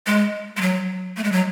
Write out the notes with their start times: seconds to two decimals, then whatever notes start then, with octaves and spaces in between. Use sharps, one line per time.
0.07 G#3
0.57 G#3
0.61 F#3
1.17 A3
1.24 G#3
1.32 F#3